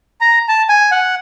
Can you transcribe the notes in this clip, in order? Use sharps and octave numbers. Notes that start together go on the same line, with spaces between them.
A#5
A5
G#5
F#5